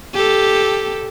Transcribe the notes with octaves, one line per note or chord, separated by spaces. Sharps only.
G4 A4